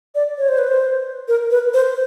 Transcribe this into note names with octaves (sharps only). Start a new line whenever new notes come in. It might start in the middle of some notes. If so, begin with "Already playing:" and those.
D5
C#5
C5
B4
C5
A#4
B4
C5